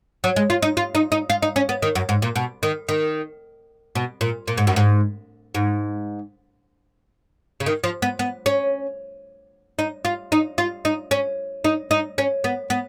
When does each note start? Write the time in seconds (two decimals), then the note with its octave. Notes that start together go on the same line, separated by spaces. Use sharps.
0.24 F#3
0.36 G#3
0.50 F4
0.62 D#4
0.77 F4
0.95 D#4
1.12 D#4
1.30 F4
1.42 D#4
1.56 C#4
1.69 B3
1.82 D#3
1.95 F#2
2.09 G#2
2.22 A#2
2.36 B2
2.63 D#3
2.89 D#3
3.95 B2
4.21 A#2
4.48 A#2
4.58 G#2
4.67 F#2
4.76 G#2
5.55 G#2
7.60 C#3
7.66 D#3
7.84 F3
8.02 B3
8.19 B3
8.46 C#4
9.79 D#4
10.05 F4
10.32 D#4
10.58 F4
10.85 D#4
11.11 C#4
11.64 D#4
11.91 D#4
12.18 C#4
12.44 B3
12.70 B3